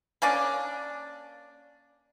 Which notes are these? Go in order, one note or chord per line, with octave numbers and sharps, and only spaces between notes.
A#3 C#4 D4 D5